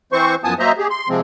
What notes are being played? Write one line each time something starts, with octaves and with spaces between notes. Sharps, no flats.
E3 C4 C5 C#6
F#2 F3 B3 G#5 A5 D#6
F#3 A#3 C5 D#5 E5 A#5
G4 G#4
C6
C3 F3 G#3 C4